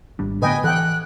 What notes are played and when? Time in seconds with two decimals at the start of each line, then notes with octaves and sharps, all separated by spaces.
0.19 G#1 G3 D4
0.42 A2 D3 B3 B4 D#5 G5 G#5
0.64 E3 A4 F#5 G5 F#6